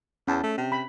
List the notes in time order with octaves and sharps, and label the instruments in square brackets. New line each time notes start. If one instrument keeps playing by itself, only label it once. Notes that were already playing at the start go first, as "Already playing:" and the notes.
[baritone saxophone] E2 [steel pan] C#4 A5
[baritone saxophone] A3
C3
[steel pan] B5